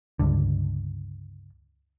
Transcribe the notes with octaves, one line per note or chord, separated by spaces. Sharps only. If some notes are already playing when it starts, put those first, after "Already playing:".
C#2 G2 D3